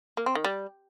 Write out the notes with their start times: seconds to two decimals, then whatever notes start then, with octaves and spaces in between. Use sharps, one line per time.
0.17 A#3
0.26 C4
0.35 D#3
0.44 G3